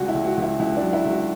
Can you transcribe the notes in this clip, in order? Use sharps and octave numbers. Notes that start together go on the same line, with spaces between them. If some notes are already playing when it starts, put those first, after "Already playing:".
Already playing: C#2 G3 F#4
E4
C#2
F#4
C#2
E4
C#2 E4
D4
F#3
E4
C#2 F#4